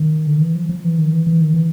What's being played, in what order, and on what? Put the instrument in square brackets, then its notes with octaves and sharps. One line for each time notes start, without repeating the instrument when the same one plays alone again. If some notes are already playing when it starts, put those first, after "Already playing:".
Already playing: [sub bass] D#3
D3
D#3
E3
F3
F3
E3
D#3
E3
E3
D#3
E3